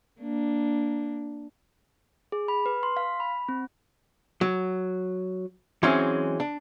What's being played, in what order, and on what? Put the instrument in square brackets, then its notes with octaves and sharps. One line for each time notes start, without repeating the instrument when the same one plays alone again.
[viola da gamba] A#3 D4
[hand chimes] G#4
B5
B4
C6
F5
B5
C4
[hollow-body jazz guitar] F#3
E3 F#3 G#3 C4 C#4
D4